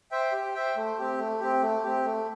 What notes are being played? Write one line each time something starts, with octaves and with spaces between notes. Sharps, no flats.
C5 E5 G5
G4
C5 E5 G5
A3
C4 G4
A3
C4 G4
A3
C4 G4
A3